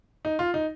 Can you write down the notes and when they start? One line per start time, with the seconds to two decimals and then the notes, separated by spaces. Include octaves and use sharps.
0.25 D#4
0.39 F4
0.54 D#4